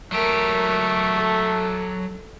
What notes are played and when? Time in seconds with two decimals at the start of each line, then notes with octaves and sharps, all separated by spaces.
0.12 F#3 A3 G4 A#4
1.15 A4